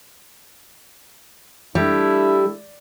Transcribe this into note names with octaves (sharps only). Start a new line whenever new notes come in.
G3 A3 D4 E4